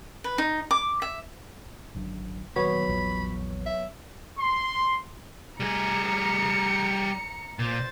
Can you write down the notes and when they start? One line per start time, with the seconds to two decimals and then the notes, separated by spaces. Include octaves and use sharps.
0.24 B4
0.38 D#4
0.71 D6
1.02 E5
1.95 G#1 F#2 D3
2.56 D#1 D#2 F#3 B3 C#5 B5
2.88 A#1 E2 F3
3.66 E5
4.39 C6
5.60 G3 G#4 A#5 C#7
7.59 A#2 C5 A6